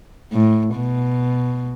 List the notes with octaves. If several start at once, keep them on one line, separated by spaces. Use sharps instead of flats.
A2
B2